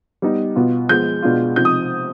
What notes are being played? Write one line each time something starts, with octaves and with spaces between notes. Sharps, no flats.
G3 B3 D#4
B2 B3 F4
F3 G#3 B3 G6
B2 G#3 B3 D4 F4
C3 F3 C4 D#4 G6
D#6